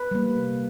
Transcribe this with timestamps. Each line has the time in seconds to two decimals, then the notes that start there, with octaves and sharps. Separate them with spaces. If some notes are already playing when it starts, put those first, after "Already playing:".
Already playing: B4
0.11 G3 A#3
0.36 C3